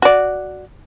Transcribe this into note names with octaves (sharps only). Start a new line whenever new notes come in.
F#4 D5